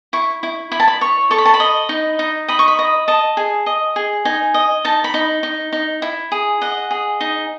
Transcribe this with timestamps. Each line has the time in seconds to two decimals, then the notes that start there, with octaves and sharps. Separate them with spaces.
0.13 E4 C#6
0.43 E4
0.72 E4 B5
0.80 A5
0.88 B5
1.01 C#5 C#6
1.31 A4 C#6
1.38 B5
1.45 A5
1.54 B5
1.60 D#5
1.89 D#4
2.19 D#4
2.48 D#5 B5
2.59 C#6
2.68 B5
2.79 D#5
3.08 D#5 A5
3.37 G#4
3.66 D#5
3.96 G#4
4.25 D#4 G#5
4.54 D#5
4.85 D#4 A5
5.04 B5
5.14 D#4
5.43 D#4
5.72 D#4
6.02 E4
6.32 G#4
6.61 D#5 F#5
6.91 G#4
7.21 D#4